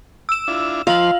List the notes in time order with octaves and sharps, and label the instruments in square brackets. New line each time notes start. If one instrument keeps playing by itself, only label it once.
[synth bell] E6 E7
[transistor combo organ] D4 E4 F4
[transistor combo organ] F3 C5 [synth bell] F4 F#7 [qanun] F5